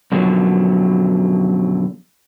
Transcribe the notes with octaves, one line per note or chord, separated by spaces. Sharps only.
F#2 B2 D3 F3 F#3